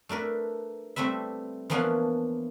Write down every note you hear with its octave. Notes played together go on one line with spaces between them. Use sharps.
A3 D4 A#4 B4
G3 A3 C4 B4 E5
E3 F3 A#3 B3 C#4 D4